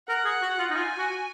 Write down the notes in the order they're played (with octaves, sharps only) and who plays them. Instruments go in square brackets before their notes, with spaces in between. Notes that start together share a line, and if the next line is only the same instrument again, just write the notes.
[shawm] A#4 [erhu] F#5
[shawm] G#4
F#4
F4
D#4
[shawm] F4 [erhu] G#5
[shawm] F#4